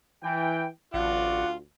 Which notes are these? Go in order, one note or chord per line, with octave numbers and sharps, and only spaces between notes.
E3 G5
A1 D2 F4 F#4 D5 F#5